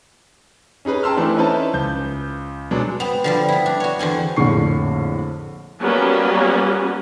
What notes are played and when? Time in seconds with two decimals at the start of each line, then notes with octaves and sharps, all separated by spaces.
0.85 C#4 D#4 G#4 B4
1.03 G5 A5 A#5 C6 E6 F6
1.17 E3 A3 C4 D4 E4
1.36 C#4 D#4 E4 B4 C5 A5
1.73 C#2 G6
2.71 B2 F#3 G#3 D4
3.00 B3 C4
3.24 D3 F3 G3
3.49 B3 E4
3.66 D4
3.80 F#4 C#5
3.99 E2 D3 C4 G#5
4.36 A#1 F2 A2 D3 C#6 C7
5.79 F#3 G3 A#3 B3 C#4